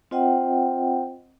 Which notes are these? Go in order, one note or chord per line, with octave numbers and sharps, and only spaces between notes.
C4 F4 C5 D#5 F#5 G5